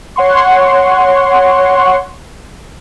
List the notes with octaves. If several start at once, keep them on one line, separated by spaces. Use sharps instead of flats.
C#5 F#5 C6 C#6